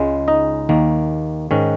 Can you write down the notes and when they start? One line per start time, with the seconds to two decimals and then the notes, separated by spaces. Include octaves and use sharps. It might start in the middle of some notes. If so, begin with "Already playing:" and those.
Already playing: C#2 C#3 G#3
0.28 D#4 D#5
0.69 D#2 D#3 A#3
1.51 G#2 D#3 C#4